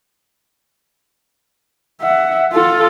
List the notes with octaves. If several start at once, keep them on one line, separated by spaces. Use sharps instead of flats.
E5 F#5
F4 A4